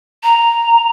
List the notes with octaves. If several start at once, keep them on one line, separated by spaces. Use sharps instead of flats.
A#5